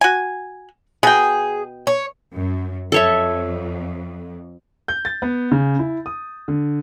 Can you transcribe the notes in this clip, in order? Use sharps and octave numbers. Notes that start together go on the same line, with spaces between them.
F#4 G#5
B2 G#4 G5
C#5
F#2
F2 A4 C#5 E5
G6
A6
B3
C#3
E4
D#6
D3